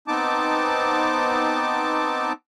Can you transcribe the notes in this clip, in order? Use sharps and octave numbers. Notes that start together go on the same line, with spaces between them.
B3 C4 D#4 A5 D6